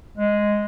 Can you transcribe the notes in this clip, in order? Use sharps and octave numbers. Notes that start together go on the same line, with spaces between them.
G#3